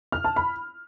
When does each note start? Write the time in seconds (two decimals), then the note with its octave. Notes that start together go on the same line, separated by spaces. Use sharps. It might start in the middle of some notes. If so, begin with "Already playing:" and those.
0.12 F6
0.24 A5
0.36 B5